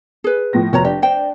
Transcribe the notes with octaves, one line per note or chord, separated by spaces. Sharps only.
G#4 B4
A2 F3 A#6
F1 F#4 C#5 A#5
D4 G4
C5 G5